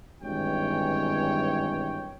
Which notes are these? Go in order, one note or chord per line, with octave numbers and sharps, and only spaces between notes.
G#1 G2 B2 E3 C#5 G5